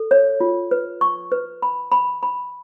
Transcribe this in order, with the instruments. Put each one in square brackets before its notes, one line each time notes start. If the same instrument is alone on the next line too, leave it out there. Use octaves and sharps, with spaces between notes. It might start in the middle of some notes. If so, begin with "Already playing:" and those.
Already playing: [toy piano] A4
C#5
F4
B4
C#6
B4
B5
B5
B5